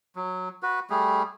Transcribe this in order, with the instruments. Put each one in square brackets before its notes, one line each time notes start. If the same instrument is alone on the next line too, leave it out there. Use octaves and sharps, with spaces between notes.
[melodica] F#3
F#4 B4
G3 A3 G#4